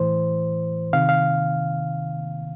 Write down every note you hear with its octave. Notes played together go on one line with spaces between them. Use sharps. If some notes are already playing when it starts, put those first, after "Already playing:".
Already playing: A2 E3 C5
C3 D#3 F5
F5